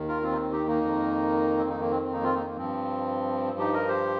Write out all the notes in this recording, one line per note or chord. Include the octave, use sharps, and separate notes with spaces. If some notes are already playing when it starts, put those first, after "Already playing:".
Already playing: D#2 D#3
F4 A#4
C4 F4
D#4
C4
D#4 G4
A#3 D#4
F2 D#3
C4
A#3 D#4
A#3
C4
C4
A#3 D#4
C4 F4
A#3 D#4
A#3
G2 F3 C4
D#4 G4
A#4 D#5
G4 C5